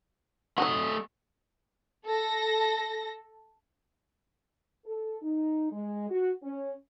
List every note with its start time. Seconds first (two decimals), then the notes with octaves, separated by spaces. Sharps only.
0.58 F#3 A3 D#4 F#4 D#5
2.06 A4 A#6
4.86 A4
5.22 D#4
5.72 G#3
6.10 F#4
6.42 C#4